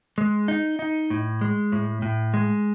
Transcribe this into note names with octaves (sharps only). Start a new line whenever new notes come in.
G#3
D#4
D#4
A2
G#3
A2
A2
G#3